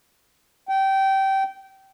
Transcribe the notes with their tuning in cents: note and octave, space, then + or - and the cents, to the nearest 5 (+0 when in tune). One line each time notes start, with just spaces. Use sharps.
G5 -20